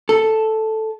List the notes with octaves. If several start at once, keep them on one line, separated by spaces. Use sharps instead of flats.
A4